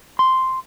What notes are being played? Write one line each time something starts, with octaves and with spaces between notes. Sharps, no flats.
C6